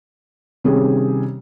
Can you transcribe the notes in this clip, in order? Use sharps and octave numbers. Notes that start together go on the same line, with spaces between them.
C3 D#3 G3 C#4 G#4